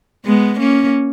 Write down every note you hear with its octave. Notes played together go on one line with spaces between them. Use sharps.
G#3 B3
A#3 C#4